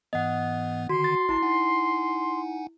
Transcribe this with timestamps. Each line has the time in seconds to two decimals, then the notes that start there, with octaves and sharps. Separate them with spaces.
0.13 G#2 E3 B3 D#5 F#5
0.89 D3 D#3 F#4 C6
1.04 A6
1.29 G#1 E4 A5 C7
1.42 D#4 F#5 G#5